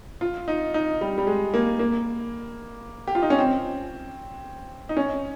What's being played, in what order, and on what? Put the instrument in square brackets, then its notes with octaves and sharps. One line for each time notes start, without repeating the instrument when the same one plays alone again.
[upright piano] F4
D#4
D#4
G3
G3
G#3
A#3
A#3
G4
F4
D#4
C#4
C4
D#4
C#4